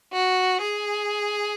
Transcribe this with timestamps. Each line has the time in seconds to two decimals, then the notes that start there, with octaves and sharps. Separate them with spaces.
0.14 F#4
0.63 G#4